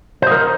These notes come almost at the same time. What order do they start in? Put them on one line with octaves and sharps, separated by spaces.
C5 D#5 A#4